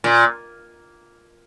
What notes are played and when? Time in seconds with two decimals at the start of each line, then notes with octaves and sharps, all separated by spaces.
0.04 A#2